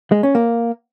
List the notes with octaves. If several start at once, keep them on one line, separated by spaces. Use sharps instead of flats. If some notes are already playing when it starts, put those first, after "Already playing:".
G#3
C#4
A#3